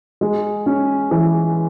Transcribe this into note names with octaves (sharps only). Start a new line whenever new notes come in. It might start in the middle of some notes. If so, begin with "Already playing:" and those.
G#3
C#4
E3